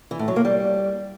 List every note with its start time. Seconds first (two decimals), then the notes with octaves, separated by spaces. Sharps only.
0.11 E3
0.19 A2
0.28 F#3
0.36 A#3
0.45 G3